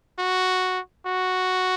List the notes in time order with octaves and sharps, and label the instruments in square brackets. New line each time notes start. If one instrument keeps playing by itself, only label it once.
[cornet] F#4
F#4